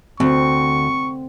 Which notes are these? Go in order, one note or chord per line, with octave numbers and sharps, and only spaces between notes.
D2 C4 C#6